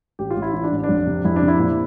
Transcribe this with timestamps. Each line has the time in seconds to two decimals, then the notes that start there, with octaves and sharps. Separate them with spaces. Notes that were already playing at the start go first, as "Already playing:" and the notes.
0.19 A1 G4
0.31 F4
0.36 A1
0.42 E4
0.54 E3 E4
0.64 D4
0.71 A1
0.84 D4
0.89 F2
1.06 C3
1.25 F2 E4
1.36 D4
1.42 C3
1.48 E4
1.59 A#2 E4